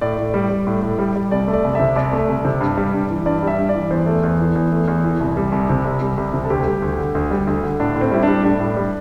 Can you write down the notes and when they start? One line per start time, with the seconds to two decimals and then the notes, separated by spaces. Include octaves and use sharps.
0.01 A2 D5
0.18 A2
0.34 G3
0.50 G3
0.67 A2
0.82 A2
0.99 G3
1.16 G3
1.31 C2 D5
1.48 A3
1.53 D5
1.64 C2
1.75 C3 E5
1.96 C2 D5
2.13 A3
2.29 C2
2.45 C3
2.61 G2
2.77 G3
2.94 G2
3.10 E3
3.26 G2 D5
3.43 G3 E5
3.59 G2
3.69 D5
3.75 E3
3.91 E2 C5
4.06 A3
4.23 E2
4.40 E3
4.56 E2
4.72 A3
4.88 E2
5.04 E3
5.20 C2
5.37 G3
5.52 C2
5.69 C3
5.85 C2
6.01 G3
6.17 C2
6.34 C3
6.44 A4
6.50 D2 G4
6.67 G3
6.82 D2
6.98 D3
7.15 D2
7.31 G3
7.47 D2
7.63 D3
7.80 A2 D4
7.96 A2
8.01 C4
8.12 G3 E4
8.23 G3 D4
8.44 A2 D4
8.60 A2
8.77 G3